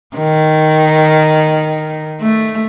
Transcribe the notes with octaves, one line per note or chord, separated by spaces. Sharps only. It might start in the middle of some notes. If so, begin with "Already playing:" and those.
D#3
A3